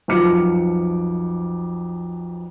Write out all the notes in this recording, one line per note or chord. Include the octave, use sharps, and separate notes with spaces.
B1 F2 F3 D6 F6 C#7